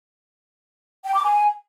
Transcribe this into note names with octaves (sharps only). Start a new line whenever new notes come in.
G5
D6
G#5